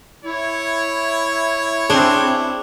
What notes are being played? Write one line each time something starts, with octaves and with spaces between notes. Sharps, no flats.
E4 C#5
C4 D4 G#4 C5